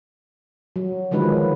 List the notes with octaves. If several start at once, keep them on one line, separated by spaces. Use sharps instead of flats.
F#3
D3 D#3 F3 F#3 G#3 B4